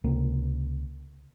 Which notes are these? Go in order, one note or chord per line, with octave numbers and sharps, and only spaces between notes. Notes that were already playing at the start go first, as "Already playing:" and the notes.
C#2 C3 A#3